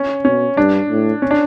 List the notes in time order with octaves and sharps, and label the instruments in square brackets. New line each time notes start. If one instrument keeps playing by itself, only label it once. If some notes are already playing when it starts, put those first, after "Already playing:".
Already playing: [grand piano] C#4
[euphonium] B2 [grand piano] C#4
[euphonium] G2 [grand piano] D4
[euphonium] A2
[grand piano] C#4
D4